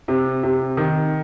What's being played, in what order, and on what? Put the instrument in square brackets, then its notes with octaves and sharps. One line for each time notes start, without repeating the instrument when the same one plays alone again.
[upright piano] C3
C3
D#3